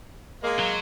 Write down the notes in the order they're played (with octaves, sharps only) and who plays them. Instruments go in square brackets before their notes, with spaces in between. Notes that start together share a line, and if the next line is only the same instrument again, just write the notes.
[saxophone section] G#3 A#3
[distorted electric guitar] F#3